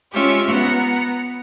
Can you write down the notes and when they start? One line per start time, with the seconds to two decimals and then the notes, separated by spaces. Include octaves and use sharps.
0.13 G#3 C#4 F4 G4 E5
0.47 B3 A#5